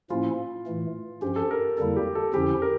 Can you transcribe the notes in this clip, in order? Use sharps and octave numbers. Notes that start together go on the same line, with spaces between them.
A2 F3 A#3 C#4 E4 F4
A2 E3 A3
G2 F3 C#4 G4
A4
A#4
F2 D3 G3 A#3 E4 A4
G4
A4
F2 D3 F3 C#4 E4 G4
A#4